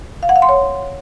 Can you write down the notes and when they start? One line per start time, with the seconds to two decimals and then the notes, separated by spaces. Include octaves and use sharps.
0.23 F5
0.29 F#5
0.36 F5
0.42 C6
0.49 C#5